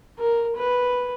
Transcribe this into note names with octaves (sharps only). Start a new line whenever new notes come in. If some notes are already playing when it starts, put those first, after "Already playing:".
A#4
B4